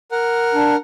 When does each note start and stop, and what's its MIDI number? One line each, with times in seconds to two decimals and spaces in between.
0.12 0.76 70
0.12 0.76 78
0.54 0.75 62